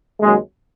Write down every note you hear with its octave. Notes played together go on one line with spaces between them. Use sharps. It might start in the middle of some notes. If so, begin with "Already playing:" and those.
D#2 C#3 F#3 G#3